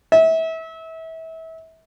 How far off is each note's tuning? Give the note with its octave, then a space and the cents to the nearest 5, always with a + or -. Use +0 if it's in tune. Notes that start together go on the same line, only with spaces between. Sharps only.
E5 -30